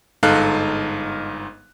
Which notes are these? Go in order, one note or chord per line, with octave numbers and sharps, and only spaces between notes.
G1 G#2 D#4 A4 F5 F#6